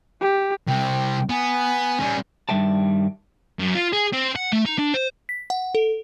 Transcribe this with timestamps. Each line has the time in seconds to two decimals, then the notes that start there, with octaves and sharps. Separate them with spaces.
0.21 G4
0.68 C2 C3 G5
1.30 B3 G#5
2.00 G3 C#4
2.49 G2 D#3 G3 E5 G5 A5
3.60 F#2
3.75 F4
3.93 G#4
4.13 C4
4.36 F#5
4.53 A3
4.66 D#4
4.78 D4
4.94 C5
5.29 B6
5.50 F#5
5.75 A4